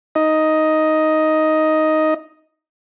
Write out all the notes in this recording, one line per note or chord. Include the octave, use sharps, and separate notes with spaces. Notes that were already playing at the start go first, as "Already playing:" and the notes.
D#4 D#5